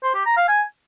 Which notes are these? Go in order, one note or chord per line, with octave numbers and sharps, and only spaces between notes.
C5
G4
A#5
F5
G#5